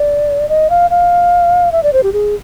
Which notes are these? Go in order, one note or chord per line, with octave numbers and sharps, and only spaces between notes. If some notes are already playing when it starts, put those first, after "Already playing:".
Already playing: D5
D#5
F5
F5
E5
D5
C5
G4
G#4